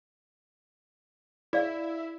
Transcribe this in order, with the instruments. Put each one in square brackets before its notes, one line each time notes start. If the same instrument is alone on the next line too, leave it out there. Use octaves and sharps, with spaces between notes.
[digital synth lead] E4 [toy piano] G#4 D5 F5